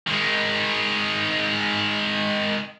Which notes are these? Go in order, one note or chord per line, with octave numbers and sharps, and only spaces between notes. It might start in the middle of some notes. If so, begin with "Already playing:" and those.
D#3 G#3